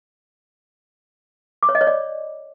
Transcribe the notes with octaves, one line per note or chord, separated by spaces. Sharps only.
D6
C#5
D#5
C#5
D5